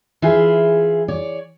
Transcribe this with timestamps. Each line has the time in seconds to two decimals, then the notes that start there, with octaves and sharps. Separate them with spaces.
0.22 E3 F4 G#4 E5
1.08 C#5 D5